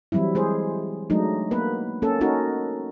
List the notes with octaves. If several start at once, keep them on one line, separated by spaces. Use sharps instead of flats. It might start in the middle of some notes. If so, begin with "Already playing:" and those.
E3 F#3 G3 C4 E4
G#3 G#4 C5
F#3 G#3 A3 D4 D#4
A#3 B3 B4
A#3 C#4 A4
C#4 D#4 F#4 A#4